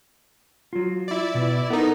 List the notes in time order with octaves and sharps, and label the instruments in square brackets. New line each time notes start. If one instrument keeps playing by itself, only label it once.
[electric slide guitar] F#3 F4
[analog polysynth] E4 D5
[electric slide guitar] B2
[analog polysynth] B3 D#4 [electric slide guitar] A4 A#4